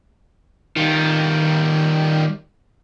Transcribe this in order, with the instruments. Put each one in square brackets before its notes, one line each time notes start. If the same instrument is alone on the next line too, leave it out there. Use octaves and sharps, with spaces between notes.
[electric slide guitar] D#3 [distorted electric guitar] G3 F4